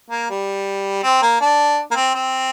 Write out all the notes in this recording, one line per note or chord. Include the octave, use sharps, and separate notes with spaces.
A#3
G3
C4
A#3
D4
A#3
C4
C4